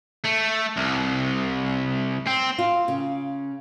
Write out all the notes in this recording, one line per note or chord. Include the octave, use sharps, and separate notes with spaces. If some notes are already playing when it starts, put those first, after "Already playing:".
A3
C2
C4
F4
C#3